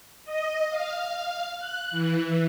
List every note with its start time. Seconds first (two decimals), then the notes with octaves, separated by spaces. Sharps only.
0.25 D#5
0.69 F5
1.58 F#6
1.91 E3